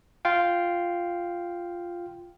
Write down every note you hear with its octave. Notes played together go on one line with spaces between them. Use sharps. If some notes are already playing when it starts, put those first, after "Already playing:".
F4 F5 G5